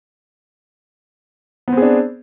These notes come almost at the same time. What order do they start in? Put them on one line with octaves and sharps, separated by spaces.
B3 C4 G#4 D4